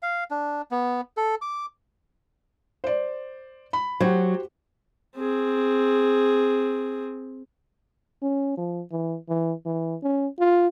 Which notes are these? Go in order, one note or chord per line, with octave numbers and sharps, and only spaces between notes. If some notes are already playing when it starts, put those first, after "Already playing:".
F5
D4
B3
A4
D6
C5 D5
B5
F#3 F#4 G4 C5
C4 G#4
C#4
F3
E3
E3
E3
C#4
F4